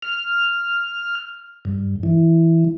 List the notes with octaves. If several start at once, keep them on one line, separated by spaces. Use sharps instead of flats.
F6
G2
E3